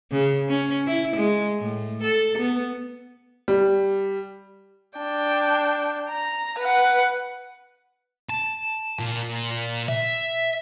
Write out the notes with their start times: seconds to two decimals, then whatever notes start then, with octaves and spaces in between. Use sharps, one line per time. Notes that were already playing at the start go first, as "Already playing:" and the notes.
0.12 C#3
0.49 C#4
0.87 E4
1.16 G#3
1.58 A2
2.03 A4
2.38 B3
3.48 G3
4.98 D4 G5
6.09 A#5
6.59 B4 F#5
8.30 A5
8.99 A#2
9.88 E5